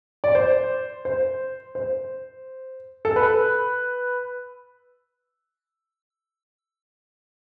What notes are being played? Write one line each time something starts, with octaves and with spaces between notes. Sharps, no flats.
D5
C5
C5
C5
A4
B4